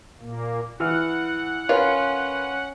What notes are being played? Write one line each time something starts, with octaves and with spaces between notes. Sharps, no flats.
A#2 A#3
E3 F#5 F6
C#4 F4 A#4 B4 C#5